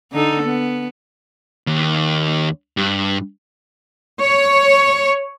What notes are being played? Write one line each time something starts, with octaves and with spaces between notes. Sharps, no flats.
D3 D#4 A4
B3
D#2
G2
C#5